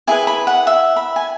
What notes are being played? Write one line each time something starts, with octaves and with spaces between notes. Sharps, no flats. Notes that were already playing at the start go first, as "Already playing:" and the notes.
E4 G#4 B4 G#5
B5
F#5
E5
B5
G#5